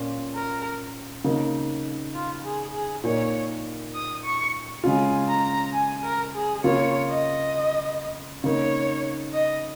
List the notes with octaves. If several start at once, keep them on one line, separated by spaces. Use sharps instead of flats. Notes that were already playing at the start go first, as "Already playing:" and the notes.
Already playing: A#2 C#4 F4
A#4
C#3 A#3 D#4
F4
G#4
G#4
A#2 A#3 D#4 C#5
D#6
C#6
C#3 G#3 C#4 F4 G#5
A#5
G#5
A#4
G#4
C#3 A#3 F4 C#5
D#5
C#3 A#3 D#4 C#5
D#5